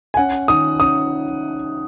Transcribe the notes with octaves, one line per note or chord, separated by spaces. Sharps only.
G#5
C#4 F#5
D#3 D#6
C#4 D#6